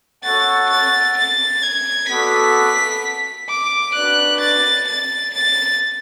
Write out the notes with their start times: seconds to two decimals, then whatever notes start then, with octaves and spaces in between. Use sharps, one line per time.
0.24 F#4 A4 C#5 F#5 A6
0.70 A6
1.17 A6
1.62 G#6
2.09 B3 F#4 A4 D5 B6
3.49 D6
3.94 D4 F#4 B4 D5 F#6
4.40 A6
4.88 A6
5.34 A6